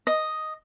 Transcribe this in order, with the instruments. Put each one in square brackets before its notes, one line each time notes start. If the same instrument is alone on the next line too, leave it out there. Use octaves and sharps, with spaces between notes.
[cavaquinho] D#5